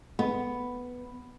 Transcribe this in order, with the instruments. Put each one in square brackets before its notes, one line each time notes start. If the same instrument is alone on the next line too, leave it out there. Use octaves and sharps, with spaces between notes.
[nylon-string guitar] B3